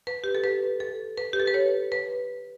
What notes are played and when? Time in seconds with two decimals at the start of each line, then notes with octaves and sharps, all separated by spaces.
0.07 B4
0.24 G4
0.35 A4
0.44 B4
0.80 A4
1.18 B4
1.33 G4
1.40 A4
1.47 B4
1.54 C#5
1.92 B4